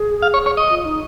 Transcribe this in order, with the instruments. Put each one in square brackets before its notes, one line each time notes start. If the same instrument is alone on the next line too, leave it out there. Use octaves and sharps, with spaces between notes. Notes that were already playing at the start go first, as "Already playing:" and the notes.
Already playing: [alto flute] G#4
[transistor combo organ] F5
C#5
C#5
D#5
[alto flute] F4
D#4